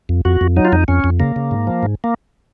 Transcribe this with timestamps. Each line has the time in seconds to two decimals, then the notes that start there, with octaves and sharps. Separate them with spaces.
0.09 F2
0.25 F2 F#4
0.41 F2
0.57 F#3 D#4
0.65 F4
0.72 F2 D#4
0.88 F2 C#4
1.04 F2
1.20 C#3 A#3
1.36 C#3
1.51 G#2
1.67 F3
1.83 G#2
2.04 A#3